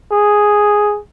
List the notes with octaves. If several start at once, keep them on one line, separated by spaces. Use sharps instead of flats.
G#4